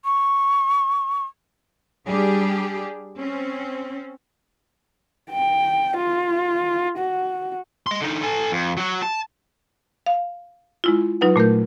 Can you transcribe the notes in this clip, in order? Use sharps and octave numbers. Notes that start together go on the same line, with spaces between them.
C#6
G3 D4 G4 G#4
C4 C#4
G5
F4
F#4
D#5 C6
D3 D#4
A4 G#5
F2
F#3 F#4
A5
F5
G#3 E4 F4
F#3 D#4 F4 B4 F#5
A#2 A3 A#4 G6